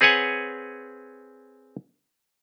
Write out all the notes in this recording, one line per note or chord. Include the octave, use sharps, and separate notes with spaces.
C4 G#4 B4 C#5 F#5 G#5